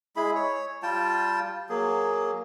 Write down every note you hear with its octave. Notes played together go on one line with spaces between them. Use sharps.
G#3 E4 G#4 B5
C#5
G3 F4 G5 A5
F#3 A#3 G#4